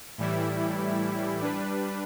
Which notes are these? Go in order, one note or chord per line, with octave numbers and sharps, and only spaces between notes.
A2 E3 G3 E4
G3 D4 B4